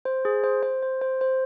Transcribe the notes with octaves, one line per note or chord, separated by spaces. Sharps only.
C5
G#4
C5
C5
C5
C5
C5